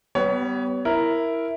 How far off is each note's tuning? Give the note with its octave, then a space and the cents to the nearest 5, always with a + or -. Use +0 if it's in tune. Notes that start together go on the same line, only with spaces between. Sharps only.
G3 -15 B3 +15 C#5 +25
E4 +0 A#4 +0